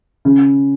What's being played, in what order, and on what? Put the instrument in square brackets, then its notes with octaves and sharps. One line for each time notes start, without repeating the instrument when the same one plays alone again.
[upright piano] C#3